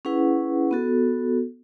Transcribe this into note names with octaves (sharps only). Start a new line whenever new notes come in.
C#4 E4 G#4 B4 F#5
B3 F#4 A4